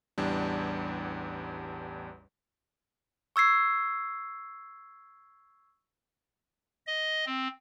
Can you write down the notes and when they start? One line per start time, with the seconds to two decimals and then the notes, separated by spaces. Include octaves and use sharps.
0.18 A1 E2 G3 D4
3.36 C#6 E6 G#6 C7
6.86 D#5
7.26 C4